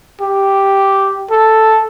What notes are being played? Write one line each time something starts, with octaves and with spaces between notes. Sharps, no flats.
G4
A4